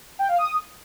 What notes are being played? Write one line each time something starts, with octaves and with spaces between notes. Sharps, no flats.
G5
F5
D#6